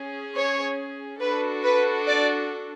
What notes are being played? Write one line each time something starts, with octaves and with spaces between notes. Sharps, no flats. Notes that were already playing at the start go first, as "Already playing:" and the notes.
Already playing: C#4 G#4
C#5
D4 F#4 A4 B4
B4
D5